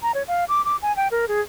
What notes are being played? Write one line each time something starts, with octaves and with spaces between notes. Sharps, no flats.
A#5
C#5
F5
D6
D6
G#5
G5
A#4
G#4